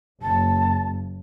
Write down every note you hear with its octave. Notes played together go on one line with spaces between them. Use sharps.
F#1 A5